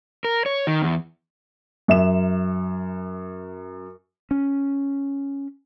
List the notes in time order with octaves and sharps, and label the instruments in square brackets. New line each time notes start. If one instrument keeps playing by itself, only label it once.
[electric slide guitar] A#4
C#5
D#3
E2
[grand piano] F#2 E5 E7
[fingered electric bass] C#4